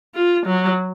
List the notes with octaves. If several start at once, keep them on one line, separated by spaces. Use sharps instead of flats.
F4
F#3